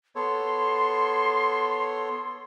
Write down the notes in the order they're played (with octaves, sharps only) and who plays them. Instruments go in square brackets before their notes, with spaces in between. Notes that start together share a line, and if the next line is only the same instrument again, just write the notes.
[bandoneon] B3 A4 C#5 [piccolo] C6